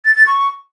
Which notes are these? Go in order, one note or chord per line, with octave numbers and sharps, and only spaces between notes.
A6
A6
C#6